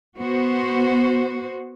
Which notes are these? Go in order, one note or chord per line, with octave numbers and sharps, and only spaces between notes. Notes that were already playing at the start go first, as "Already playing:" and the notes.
B3 F#4 C5